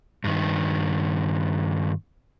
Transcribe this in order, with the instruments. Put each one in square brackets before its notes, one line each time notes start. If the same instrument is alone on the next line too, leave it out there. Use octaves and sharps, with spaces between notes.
[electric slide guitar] G2 D#3